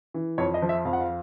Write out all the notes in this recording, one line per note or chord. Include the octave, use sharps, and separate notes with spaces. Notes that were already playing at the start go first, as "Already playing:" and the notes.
E3
F2 C#5
D#5
F3
E5
F2 F5
F#5
F5